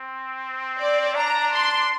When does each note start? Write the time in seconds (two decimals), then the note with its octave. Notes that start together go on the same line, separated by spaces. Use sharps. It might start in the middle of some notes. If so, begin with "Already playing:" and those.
Already playing: C4
0.78 D5
1.15 D4 A#5
1.53 C6